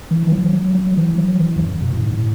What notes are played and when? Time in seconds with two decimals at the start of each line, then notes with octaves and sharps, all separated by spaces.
0.11 E3
0.27 E3
0.32 F#3
0.53 F#3
0.75 F#3
0.97 E3
1.18 F#3
1.40 E3
1.56 E2
1.60 F#2
1.82 B2
1.92 A2
2.02 G#2
2.12 A2